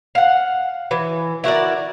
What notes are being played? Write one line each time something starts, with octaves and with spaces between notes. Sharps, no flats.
F5 F#5
E3
E4 F#4 A#4 D5